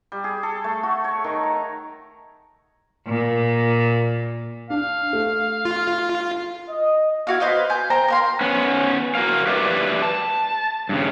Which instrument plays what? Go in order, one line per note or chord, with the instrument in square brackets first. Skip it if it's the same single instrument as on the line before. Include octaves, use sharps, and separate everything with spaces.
[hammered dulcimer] G3
G#4
A4
A3
F#4
C#5
D#3
A#5
[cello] A#2
[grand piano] D4 [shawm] F5
[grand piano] A3
[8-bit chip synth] F4
[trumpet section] D#5
[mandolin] E4 F#4 F5
B4 C5 D#5 F5
G#5 G6
C5 G5 A#5
A#4 F5 C6
[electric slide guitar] B3 C#4
F#4 A#4 F5
G4 B4 D5 E5 G5
A5
G2 C#3